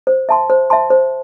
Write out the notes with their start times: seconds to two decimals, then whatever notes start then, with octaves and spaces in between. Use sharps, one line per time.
0.07 C5
0.29 E5 A5 C6
0.50 C5
0.70 E5 A5 C6
0.90 C5